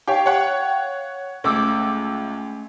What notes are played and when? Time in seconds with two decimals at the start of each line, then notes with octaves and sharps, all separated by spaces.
0.07 G4 C#5 F5 G5
0.26 C#5 F#5
1.44 C#2 A3 C#4 A4 D6